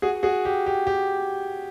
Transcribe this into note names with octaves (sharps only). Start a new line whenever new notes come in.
F#4 G#4
F#4 G#4
G4
G4
G4